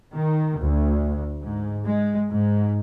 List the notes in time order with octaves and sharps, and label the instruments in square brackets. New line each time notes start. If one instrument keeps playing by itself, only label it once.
[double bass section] D#3
D2
G#2
G#3
G#2